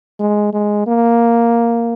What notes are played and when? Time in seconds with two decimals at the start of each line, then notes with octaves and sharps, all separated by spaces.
0.20 G#3
0.53 G#3
0.87 A#3